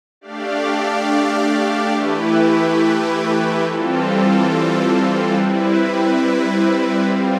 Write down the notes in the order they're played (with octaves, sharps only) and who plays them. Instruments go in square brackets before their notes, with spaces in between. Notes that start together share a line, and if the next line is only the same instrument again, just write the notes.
[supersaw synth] A3 D4 G4 D5 F5
E3 A3 E4 G4 B4
E3 G3 C4 F4 A4
G3 C4 E4 B4
G3 C4 F4